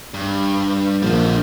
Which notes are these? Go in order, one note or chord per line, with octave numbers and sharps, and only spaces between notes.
G2
A#1 D3 F3